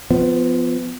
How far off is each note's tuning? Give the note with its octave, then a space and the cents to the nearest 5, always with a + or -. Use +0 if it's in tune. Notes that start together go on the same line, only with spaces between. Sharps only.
F3 +0 B3 +25